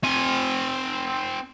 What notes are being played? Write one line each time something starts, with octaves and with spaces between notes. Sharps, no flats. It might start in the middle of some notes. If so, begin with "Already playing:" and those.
C4 G#5